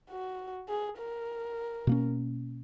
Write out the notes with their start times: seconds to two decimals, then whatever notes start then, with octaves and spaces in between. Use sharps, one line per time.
0.10 F#4
0.69 G#4
0.98 A#4
1.87 B2 A#3 C#4